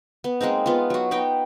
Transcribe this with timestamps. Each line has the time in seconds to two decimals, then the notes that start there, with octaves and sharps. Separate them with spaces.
0.24 B3
0.41 G#3 A#3 C4 D#4
0.66 B3 F4
0.90 F#3 F#4
1.11 B3 D#4 G5